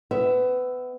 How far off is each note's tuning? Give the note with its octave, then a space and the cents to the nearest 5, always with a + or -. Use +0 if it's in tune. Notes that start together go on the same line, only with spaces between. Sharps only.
B3 +25 E5 +0